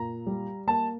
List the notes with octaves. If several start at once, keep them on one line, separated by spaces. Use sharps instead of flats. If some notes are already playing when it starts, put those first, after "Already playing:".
Already playing: A#2 A#5
G3
A#3 A5